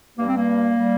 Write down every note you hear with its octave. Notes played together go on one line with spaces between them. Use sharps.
G2 G3 A#3
C4
A#3
G3